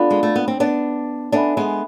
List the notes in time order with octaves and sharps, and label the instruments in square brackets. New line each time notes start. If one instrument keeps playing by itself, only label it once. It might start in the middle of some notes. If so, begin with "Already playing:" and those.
Already playing: [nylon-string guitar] B3 D4 [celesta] F4 A4 D5 F5 B5
[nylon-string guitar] G#3
A3
B3
C4
B3 D4
[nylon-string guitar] B3 D4 [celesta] A4 E5 G#5 B5
[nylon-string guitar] G#3 B3